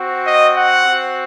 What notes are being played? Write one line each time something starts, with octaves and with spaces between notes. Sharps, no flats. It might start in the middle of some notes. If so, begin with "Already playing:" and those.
Already playing: C4 F#4
D#5
F#5
C4 F#4